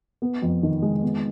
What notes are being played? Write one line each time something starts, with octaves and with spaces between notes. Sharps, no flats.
B3
F2
D#3
G#3
B3